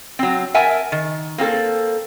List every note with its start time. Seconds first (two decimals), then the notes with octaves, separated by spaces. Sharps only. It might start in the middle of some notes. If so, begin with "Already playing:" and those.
0.19 F#3 C4
0.54 A#4 E5 F#5 G#5 A5
0.92 D#3
1.38 A#3 C4 F#4 A4